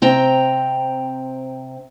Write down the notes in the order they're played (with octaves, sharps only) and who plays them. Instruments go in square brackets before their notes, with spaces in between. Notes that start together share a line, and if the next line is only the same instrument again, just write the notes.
[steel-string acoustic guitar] C3 C4 G5 A#5